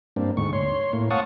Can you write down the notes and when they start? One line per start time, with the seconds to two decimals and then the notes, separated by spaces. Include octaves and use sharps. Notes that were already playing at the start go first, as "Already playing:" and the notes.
0.16 G2 A#3 C4 D4
0.37 D2 G#2 C#6
0.53 C#5 C6
0.93 A2 A#3
1.10 C#5 F5 F#5 A5 C#6 D#6